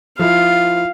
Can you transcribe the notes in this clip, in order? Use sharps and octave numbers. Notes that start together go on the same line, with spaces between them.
F3 E4 F5